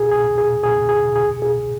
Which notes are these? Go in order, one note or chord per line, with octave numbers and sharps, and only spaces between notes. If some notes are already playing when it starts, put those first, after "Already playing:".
Already playing: G#4
G#4
G#4
G#4
G#4
G#4
G#4